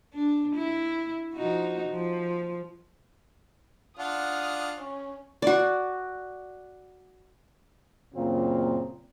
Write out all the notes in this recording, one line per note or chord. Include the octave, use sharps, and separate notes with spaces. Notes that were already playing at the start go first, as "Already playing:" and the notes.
D4
E4
F3 D#4 F#4
F3
D4 F4 F#5 D#6 F6
C#4
F#4 D5
F#2 A#2 C#3 A#3 C4 F4